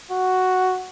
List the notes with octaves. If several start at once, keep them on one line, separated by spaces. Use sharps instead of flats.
F#4